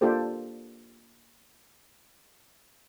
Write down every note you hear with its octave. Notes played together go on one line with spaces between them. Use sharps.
A#3 D4 F4 G4 A4 C5